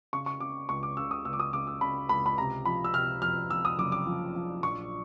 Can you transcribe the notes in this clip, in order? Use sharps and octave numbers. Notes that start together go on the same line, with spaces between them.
C#3 C#6
C#6
C#3 D6
C#2 C#6
D6
C#3 E6
D#6
C#2 E6
D6
D#6
C#3 D6
E6
C#3 B5
C#2 B5
B5
C3 A#5
F3 B5
E6
C3 F6
F2 F6
F3 E6
D#6
F#1 D6
D6
F3
F3
A#1 C#6